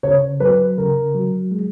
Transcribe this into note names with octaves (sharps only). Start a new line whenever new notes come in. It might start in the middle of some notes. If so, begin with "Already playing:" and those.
C#3 C#5
F#3 B4
C#3 A#4
F#3
G#3